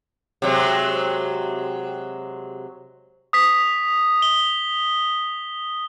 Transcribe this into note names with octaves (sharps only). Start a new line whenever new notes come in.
C3 F#3 G#3
D#6 B6
G7